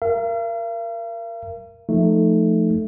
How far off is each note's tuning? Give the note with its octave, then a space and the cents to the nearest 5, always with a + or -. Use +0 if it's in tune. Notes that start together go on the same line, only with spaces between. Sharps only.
A#4 +0 F5 -45
F3 +0 A3 +0 D#4 +0